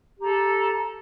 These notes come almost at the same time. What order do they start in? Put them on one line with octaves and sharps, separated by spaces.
G4 A#5 A4